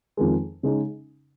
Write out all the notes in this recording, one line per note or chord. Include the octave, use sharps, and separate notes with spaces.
F2 D#3 G#3
C#3 G#3 D#4